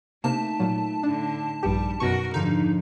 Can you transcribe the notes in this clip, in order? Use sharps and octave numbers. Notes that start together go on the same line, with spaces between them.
C3 A3 A#3 D#4 A5
A#2 F#3
A2 D3 D4
A#1 G2 G3 G4
F#2 B2 F#4 A#4 C#6
F2 G#2 D3 F3 D#4